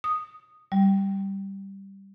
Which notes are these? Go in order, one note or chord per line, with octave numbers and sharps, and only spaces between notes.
D#6
G3